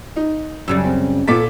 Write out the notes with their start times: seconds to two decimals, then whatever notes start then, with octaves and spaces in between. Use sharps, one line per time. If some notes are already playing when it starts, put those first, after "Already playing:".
0.16 D#4
0.68 F#2 C#3 G3 E6
0.84 C4
1.28 A#2 A3 B3 D6 B6